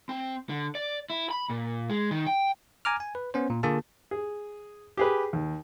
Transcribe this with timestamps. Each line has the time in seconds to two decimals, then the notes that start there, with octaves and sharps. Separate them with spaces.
0.09 C4
0.49 D3
0.75 D5
1.10 E4
1.31 B5
1.50 A#2
1.90 G#3
2.11 D#3
2.27 G5
2.85 G#5 A#5 D6 F6
3.00 G#5
3.15 B4
3.34 B3 C#4 C5
3.50 A#2
3.63 D3 A#3 F4 G#4 A5
4.11 G#4
4.97 G4 G#4 B4
5.33 D#2